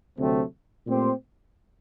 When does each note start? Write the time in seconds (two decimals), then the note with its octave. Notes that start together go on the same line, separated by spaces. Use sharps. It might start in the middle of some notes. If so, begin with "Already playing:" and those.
0.18 D2 C3 F#3 A3 C4
0.87 A#2 A3 C4 G4 C5